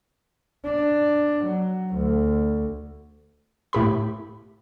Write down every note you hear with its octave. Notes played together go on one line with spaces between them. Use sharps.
D4
F#3
D2
A2 G4 B5